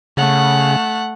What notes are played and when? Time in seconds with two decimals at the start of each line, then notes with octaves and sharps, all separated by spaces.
0.17 C#3 A3 F#5